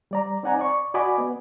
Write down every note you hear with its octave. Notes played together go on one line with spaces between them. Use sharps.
G3 D5 A#5
C4 D#4 D5 F#5 G#5 A#5
D5 C#6
F#4 D5 D#5 G#5 B5 D6
B3